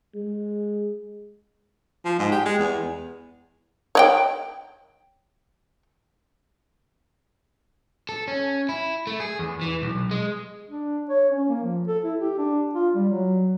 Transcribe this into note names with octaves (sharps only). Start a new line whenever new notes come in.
G#3
F3
G#2
G4
G#3
E2
C#5 D5 G5
A4
C#4
E4
A3
G#4
E2
E3
B1
G#3
D4
C#5
C#4
A#3
F3
A4
E4
G4
D4
F4
G3
F#3